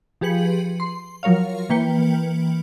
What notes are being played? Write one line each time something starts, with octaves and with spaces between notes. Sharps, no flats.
F3 G4 G#4 B4 C#7 F#7
C6
F3 F#3 A#4 C#5 F5
E3 A#3 B4 G5 C#7